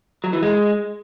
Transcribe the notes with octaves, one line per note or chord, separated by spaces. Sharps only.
F#3
E3
G#3